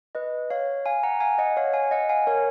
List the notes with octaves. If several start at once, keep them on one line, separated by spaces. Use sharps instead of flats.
B4 D#5
C#5 F5
F5 G#5
F#5 A#5
F5 G#5
D#5 F#5
C#5 F5
F5 G#5
D#5 F#5
F5 G#5
A#4 C#5